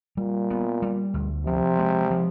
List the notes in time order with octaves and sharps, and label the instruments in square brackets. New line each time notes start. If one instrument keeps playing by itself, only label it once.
[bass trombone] A#2 [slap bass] G3
[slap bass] B3
G3
D2
[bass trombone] C3 [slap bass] F3
[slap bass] G#3
F3